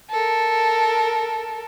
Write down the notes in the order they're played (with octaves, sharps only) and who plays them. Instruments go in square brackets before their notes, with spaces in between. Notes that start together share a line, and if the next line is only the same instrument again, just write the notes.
[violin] A4 A#4